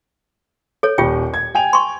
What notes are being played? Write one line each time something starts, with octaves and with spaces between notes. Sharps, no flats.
A4 C#5
D#1 F4 G4 G5
G#6
G5 G#5 F7
C6 C#6